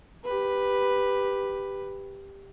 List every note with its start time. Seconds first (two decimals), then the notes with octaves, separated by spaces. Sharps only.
0.24 G4 B4